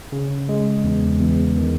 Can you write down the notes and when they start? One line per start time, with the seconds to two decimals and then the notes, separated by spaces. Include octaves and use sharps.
0.12 C#3
0.49 G#3
0.84 E2
1.21 E2
1.58 D#3